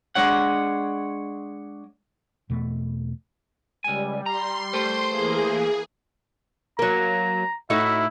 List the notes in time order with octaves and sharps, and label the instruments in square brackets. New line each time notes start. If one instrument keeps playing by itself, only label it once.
[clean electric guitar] G#3 D4 C#5 F#5
[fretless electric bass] E2 B2 A3
[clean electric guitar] C#2 G#5 [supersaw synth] G3
[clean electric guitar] A#5 [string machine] C6
[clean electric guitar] A3 G4 [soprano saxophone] C5
[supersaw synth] E3 A#3 [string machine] G#4
[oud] F#3 A#3 [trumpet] A#5
[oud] A2 D#4 F#4 [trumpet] E4